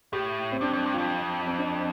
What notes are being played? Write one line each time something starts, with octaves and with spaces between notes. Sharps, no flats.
A2 G4
C4
G2 D4
F2 C4
G2
F2 F4
C4
D4